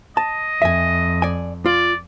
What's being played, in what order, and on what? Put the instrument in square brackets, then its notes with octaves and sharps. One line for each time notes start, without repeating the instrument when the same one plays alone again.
[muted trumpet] D#5 [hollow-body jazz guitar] A5
[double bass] F2 [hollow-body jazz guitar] E5 G#5
[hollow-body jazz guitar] D5 G#5
[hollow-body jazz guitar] F4 [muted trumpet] D5